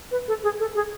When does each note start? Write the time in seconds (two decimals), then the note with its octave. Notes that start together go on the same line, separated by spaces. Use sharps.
0.11 B4
0.28 A4
0.43 G#4
0.59 A4
0.75 G#4